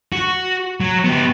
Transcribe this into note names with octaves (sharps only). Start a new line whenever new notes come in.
F#4
F#3
B3 G4